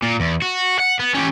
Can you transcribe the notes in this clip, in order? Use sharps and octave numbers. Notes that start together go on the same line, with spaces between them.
A#2
E2
F#4
F#5
B3
C#4 G4